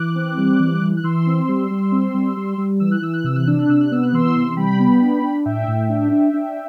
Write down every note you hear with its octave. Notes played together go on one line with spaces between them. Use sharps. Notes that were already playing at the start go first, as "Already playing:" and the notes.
Already playing: E3 D6 F#6
C4
G3
E3
E3
F#6
E3 C6 E6
C4
G3
G3
C4
G3
G3
G3
E3 E6
F#6
E3 E6
F#6
C3 E6
F#6
D4 E6
F#6
C3 E6
F#6
B3 E6
F#6
E3 C6 E6
C3
G3 G5 B5
B3
D4
D4
A2 E5 G5
A2
D4
D4
D4